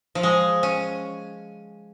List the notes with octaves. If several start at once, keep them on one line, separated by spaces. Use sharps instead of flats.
F3
G#3
C#4